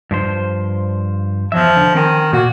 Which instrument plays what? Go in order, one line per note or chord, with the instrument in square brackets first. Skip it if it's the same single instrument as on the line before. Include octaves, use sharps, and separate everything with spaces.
[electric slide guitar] G2 F3 C5
[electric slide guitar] E2 F#3 E5 [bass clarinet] F3
[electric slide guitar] D3
[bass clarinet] D#3 [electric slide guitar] C4 G5 G#5
[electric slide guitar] A#2 A#3 [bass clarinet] F#4